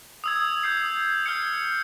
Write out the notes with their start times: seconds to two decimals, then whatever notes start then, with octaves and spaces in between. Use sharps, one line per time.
0.24 D#6 E6 G#6
0.63 D#6 G6 C7
1.26 F6 G6 C#7